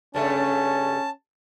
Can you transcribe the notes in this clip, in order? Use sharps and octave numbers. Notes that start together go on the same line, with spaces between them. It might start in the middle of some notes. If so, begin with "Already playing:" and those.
G2 C#3 A3 C#4 A5